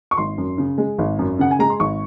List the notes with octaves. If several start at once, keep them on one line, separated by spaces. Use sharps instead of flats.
C#6
G#1 C6
F#2
C#3
G#3
G#1
F#2
C#3 F#5
G#5
G#3 A#5
C6
G#1 C#6